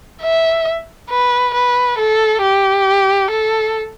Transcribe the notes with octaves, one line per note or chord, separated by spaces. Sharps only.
E5
B4
B4
A4
G4
A4